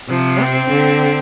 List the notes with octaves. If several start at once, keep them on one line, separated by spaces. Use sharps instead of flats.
C3 F3
C4
D3